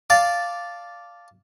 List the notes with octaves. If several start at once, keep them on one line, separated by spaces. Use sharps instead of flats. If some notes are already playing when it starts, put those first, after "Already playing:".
D5 F5 A5